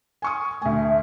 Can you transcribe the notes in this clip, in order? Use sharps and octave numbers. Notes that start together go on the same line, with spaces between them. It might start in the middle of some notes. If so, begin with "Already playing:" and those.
G#5 C#6 D#6
D2 A3 G#5